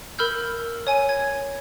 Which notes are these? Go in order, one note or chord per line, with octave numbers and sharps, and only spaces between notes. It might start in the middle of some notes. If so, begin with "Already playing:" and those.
A#4 B5 E6 F6 G6
C#5 G#5 D#7
G#6